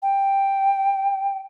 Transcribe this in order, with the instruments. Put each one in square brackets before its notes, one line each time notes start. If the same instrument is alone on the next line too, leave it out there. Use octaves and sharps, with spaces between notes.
[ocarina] G5